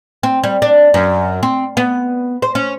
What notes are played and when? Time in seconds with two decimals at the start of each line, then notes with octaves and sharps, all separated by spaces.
0.23 C4
0.44 G3
0.62 D4
0.94 F#2
1.43 C4
1.77 B3
2.42 C5
2.55 C#4